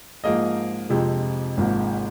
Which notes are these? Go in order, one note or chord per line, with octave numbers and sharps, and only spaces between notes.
G#2 F3 A#3 G#4 D#5
F2 C3 F3 G#3
G#1 G#2 F3 A#3